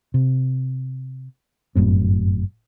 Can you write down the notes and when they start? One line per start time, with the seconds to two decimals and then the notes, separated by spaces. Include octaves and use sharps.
0.14 C3
1.75 G1 F#2 A2 C4